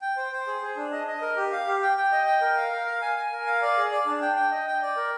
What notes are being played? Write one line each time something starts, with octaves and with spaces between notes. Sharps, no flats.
G5
C5
C5
G#4
G#4
D4
D#5
D#5
A#4
G4
F5
G4
G5
G5
D#5
G5
A#4
F5
A#4
F5
G#5
G#5
A#4
F5
D5
G#4
D5
D4
G5
G5
D#5
G5
D5
A#4